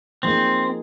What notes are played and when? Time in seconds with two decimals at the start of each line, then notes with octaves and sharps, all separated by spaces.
0.23 F3 A#3 C4 D#4 G#4